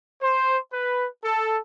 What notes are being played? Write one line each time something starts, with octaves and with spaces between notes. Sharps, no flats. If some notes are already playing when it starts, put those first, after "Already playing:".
C5
B4
A4